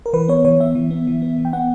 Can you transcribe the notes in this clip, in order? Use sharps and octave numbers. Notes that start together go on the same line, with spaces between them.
A#4
E3 B4
B3 C#5
E3 C#5
B3 E5
E3
B3
E3
B3
E3
G5
B3 F#5